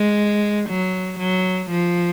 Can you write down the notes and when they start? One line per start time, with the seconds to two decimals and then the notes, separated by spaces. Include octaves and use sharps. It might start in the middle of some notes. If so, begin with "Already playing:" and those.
Already playing: G#3
0.69 F#3
1.19 F#3
1.70 F3